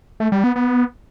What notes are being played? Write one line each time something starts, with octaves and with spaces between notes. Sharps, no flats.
A3
G3
B3
B3